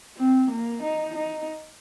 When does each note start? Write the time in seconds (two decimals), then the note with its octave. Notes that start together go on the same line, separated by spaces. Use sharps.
0.17 C4
0.50 A#3
0.82 D#4
1.16 D#4